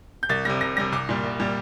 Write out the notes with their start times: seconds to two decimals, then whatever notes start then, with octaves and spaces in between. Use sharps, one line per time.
0.23 G6
0.29 C2 A6
0.45 C3 G3 A#6
0.61 C2 A#6
0.77 C3 G3 A#6
0.92 C2 D6
1.09 A#2 G3
1.23 C2
1.40 A#2 G3